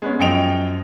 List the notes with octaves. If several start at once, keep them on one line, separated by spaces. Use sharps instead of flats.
G#3 B3 C#4
F#2 F3 D#5 G5 D7 F7